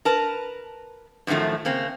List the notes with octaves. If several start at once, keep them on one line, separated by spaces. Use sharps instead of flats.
A#4 B4 A5
F#2 A2 D#3 F3 A3
C#3 A#3 C4